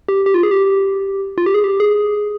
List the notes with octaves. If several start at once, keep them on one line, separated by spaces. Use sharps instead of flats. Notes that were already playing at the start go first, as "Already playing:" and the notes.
G4
G4
F4
G#4
G4
F4
G4
G#4
G4
G#4